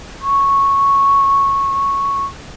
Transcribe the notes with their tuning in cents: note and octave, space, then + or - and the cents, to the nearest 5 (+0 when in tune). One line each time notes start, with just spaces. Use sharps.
C#6 -5